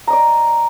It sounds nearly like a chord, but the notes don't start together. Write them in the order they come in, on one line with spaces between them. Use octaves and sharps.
A#5 D#5 D5